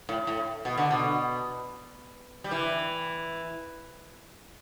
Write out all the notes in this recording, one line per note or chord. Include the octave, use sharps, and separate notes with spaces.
A2
A2
B2
D3
B2
G3
E3